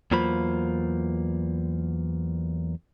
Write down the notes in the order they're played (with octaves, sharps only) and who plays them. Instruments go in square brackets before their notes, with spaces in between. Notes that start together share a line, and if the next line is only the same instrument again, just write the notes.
[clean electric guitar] E2 F#3 A#3 F4 C5 B5